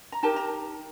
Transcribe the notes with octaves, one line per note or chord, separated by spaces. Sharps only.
A#5
D#4 G4 A#4 A5
A#5